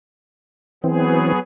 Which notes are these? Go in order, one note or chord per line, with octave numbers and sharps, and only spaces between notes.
E3 F#3 B3 C4 G#4